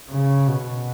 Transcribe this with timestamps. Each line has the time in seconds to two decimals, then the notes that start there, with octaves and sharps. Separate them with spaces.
0.10 C#3
0.48 B2